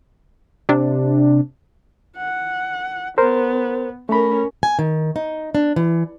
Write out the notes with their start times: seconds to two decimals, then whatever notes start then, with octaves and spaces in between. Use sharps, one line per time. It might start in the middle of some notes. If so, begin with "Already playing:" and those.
0.69 C3 D4
2.17 F#5
3.18 B3 A#4 C5
4.09 A3 C#4 A#4 B5
4.63 G#5
4.79 D#3
5.16 D#4
5.55 D4
5.76 E3